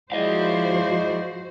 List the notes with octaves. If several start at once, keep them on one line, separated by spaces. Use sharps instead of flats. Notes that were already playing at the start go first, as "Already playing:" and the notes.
F3 G#3 E4 F#4 C5 D5 D#5 F5